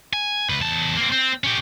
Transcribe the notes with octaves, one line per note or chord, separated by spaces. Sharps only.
G#5
C#2 B4
E2 A5
A#3 C4
C4
C#4 G4